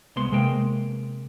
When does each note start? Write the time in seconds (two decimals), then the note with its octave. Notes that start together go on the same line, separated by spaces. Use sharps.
0.16 C2 G#3 B3 C6
0.32 C3 G#3 A#3 G5